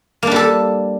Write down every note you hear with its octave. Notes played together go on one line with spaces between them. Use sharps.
G3 A#3 D4 A4